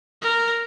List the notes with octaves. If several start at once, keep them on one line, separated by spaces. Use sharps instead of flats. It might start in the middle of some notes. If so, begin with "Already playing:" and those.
A#4